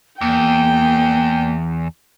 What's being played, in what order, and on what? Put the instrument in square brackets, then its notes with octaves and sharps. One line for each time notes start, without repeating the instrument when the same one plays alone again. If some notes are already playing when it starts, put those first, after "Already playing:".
[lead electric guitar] E2 [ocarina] A#3 [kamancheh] G5